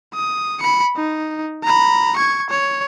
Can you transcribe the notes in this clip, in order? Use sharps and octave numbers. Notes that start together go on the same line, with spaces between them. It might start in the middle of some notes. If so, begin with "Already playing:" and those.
D#6
B5 C#7
D#4
A#5 B5
C#6 G#6
C#5